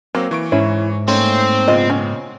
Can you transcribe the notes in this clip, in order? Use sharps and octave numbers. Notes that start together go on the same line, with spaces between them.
F#3 A#3 C4
E3 C#6 D7
G#2 C#4 E4
A3 A#3 C4 C#4 D#4
A#2 C#3 B3 F4 D#5
C#4